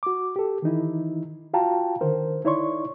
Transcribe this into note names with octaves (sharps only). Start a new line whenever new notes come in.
F#4 D6
G4 A4
D#3 E3 D#4 E4
F4 F#4 F5 G5 A5 A#5
D3 D#3 A#4 C5
D#4 E4 C#5 D5 C6 C#6